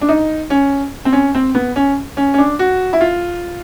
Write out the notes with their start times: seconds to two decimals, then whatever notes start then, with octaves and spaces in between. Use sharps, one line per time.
0.01 D4
0.09 D#4
0.50 C#4
1.05 C4
1.13 C#4
1.35 C4
1.55 B3
1.76 C#4
2.17 C#4
2.34 C#4
2.38 D4
2.59 F#4
2.93 E4
3.01 F4